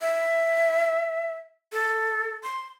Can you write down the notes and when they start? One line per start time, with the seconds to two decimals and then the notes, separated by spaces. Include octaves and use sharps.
0.01 E5
1.73 A4
2.43 C6